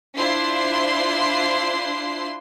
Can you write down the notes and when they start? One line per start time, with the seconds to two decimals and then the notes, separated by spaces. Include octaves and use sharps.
0.16 D4 E4 F4 C5 C6 C7